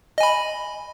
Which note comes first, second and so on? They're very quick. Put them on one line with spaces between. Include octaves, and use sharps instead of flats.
D#5 G#5 B5